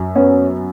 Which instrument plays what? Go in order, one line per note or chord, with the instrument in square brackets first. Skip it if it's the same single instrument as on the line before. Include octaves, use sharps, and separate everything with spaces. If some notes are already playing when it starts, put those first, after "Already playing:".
Already playing: [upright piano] F#2
[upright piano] B3 [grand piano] C#4